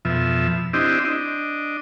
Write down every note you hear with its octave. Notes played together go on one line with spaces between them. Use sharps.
F2 B2 F3 E5
C4 D4 E4 G4 D#5
D4 D#5